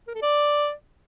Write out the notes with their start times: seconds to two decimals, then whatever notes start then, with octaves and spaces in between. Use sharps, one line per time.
0.08 A#4
0.15 A4
0.22 D5